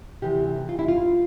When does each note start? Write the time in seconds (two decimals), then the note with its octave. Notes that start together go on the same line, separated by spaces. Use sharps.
0.22 D2 C3 E3 G4
0.69 F4
0.79 E4
0.88 F4